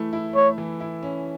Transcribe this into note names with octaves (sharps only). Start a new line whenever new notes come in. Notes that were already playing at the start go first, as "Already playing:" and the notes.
Already playing: E3 A3 E4
E4
A3 C#5
E3
E4
C#4